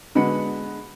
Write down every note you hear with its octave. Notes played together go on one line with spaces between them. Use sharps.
D3 G#3 B3 F#4 B5 C#7